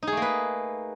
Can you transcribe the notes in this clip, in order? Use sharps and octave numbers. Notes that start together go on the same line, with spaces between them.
A3 A#3 D#4 G#4 B4